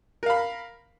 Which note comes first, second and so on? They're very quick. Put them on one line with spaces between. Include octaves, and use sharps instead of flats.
A#4 F5 B5